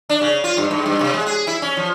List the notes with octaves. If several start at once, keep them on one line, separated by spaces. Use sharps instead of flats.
D4
C#3
F4
G2
G#2
G2
C3
G#3
G#4
E4
C#4
F3